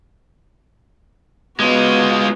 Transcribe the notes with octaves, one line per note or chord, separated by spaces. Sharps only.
G#3 B3 F4 F#4